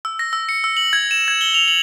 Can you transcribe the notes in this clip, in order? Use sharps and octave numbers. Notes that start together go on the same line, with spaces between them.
E6
A#6
E6
C#7
E6
F#7
G#6
E7
G#6
G7
F7
F#7